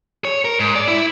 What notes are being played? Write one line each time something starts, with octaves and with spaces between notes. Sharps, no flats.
C#5
A#4
G#2
D5
E4